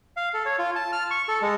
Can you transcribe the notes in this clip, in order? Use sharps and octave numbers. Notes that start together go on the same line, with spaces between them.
F5
A4
C#5
F4
A5
F6
C#6
A4
G#3